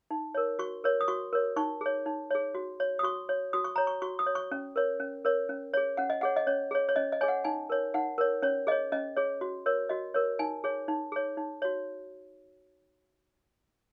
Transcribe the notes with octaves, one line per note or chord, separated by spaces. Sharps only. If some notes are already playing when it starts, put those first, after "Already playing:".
D#4
A#4 C#5
F#4 C#6
A#4 C#5
D#6
F#4 C#6
A#4 C#5
D#4 C#6
G#4 C#5
D#4
G#4 C#5
F#4
C#5
D#6
F#4 C#6
C#5
F#4 D#6
C#6
C#5 A#5
C#6
F#4 C#6
D#6
C#5
C#6
C#4
A#4 C#5
C#4
A#4 C#5
C#4
G#4 C#5
C#4 F#5
D#5
G#4 C#5 F#5
D#5
C#4 C#5
G#4 C#5
C#5
C#4 D#5
D#5
G#4 C#5 G#5
F#5
D#4 G#5
A#4 C#5
D#4 F#5
A#4 C#5
C#4 C#5
G#4 C#5 D#5
C#4 D#5
G#4 C#5
F#4
A#4 C#5
F#4 D#5
A#4 C#5
D#4 G#5
G#4 C#5
D#4
G#4 C#5
D#4
F#4 C#5